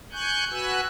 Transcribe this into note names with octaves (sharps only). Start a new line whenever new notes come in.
G#5 C#6 F#6 G6
F#4 B4 G#5 E6 F#6